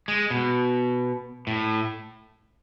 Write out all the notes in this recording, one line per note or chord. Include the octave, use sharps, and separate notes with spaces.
G#3
B2
A2